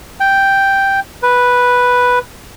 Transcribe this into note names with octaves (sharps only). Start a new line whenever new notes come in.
G5
B4